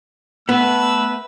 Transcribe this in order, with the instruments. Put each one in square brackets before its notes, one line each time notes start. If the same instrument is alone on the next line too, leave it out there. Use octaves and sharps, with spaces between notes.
[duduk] A3 [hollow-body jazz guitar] B3 [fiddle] B4 [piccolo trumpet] E6